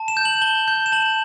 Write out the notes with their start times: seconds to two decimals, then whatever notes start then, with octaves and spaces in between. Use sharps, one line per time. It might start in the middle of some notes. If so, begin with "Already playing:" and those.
Already playing: A5
0.08 E7
0.17 G6
0.25 F#7
0.42 A5 G7
0.68 G6
0.86 E7
0.92 A5 F#7